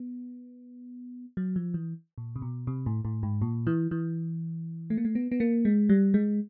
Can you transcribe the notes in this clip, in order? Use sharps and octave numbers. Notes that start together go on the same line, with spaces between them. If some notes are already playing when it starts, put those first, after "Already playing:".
Already playing: B3
F#3
F3
E3
A#2
C3
B2
C3
A2
A2
G#2
A#2
E3
E3
A3
A#3
A3
B3
B3
A#3
G#3
G3
G#3